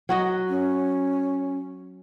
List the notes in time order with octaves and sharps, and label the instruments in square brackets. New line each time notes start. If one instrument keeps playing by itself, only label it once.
[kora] F#3 F#4 D#5
[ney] C#4